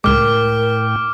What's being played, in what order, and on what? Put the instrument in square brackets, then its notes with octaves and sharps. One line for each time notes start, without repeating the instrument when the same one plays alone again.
[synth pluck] C#2 G#3 [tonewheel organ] A2 G5 [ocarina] A#4 [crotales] D6 F6